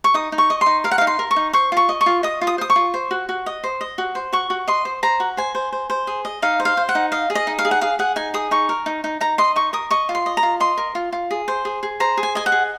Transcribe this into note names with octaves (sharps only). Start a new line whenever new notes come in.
C#6
D#4 D#6
D#4
C#6
D#5
C6
D#4
A#4 F5
F#5
F5
D#4
C6
A#4
C#6
D#4
C5 C#6
F4 C#6
D#5
C#6
F4
D#5 D#6
F4
D#6
C5 D#6
C#6
F4
C5
F#4
F#4
D#5
C5
D#5
F#4
C5
F#4 C#6
F#4
D#5 C6
C5
C5 A#5
F#4
C5 G#5
C5
C5
C5
G#4
D#5
D#4 F5
C5
F5
C5
F#5
D#4
D#5 F5
G#4
D#5
D#4
F5
G#4
F#5
G#4 F5
G#4 F#5
D#4 G#5
G#4 D#6
D#4 C#6
A#4
D#4
D#4
D#4 A#5
D#5 C6
D#4 C#6
A#4 D#6
D#5 C#6
F4
C6
D#5
A#5
F4
D#5 C6
A#4
F4
F4
G#4
C5
G#4
G#4
C5 A#5
G#4
G#5
D#5 G#5
F#5
G#4